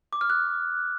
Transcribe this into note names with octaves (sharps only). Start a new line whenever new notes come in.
D6
F6
F#6